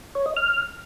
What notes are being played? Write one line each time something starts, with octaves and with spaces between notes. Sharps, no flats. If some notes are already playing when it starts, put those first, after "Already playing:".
C#5
D#5
F6